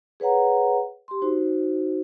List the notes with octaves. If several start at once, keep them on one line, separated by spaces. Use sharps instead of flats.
G#4 B4 C#5 F#5 A#5
G4 C6
D#4 F#4 C5